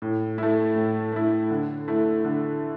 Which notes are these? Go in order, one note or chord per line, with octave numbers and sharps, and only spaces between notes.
A2
A3 E4
A2
A3 E4
D3
A3 E4
D3